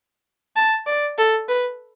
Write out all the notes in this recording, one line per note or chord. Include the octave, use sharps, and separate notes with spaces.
A5
D5
A4
B4